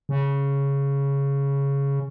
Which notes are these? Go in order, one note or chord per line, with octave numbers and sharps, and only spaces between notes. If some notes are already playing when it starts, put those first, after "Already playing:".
C#3